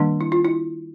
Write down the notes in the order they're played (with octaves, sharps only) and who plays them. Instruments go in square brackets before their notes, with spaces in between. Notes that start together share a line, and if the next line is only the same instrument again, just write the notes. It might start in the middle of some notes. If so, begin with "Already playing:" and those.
Already playing: [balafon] D#3 G3 A#3 D4
E4
F4
E4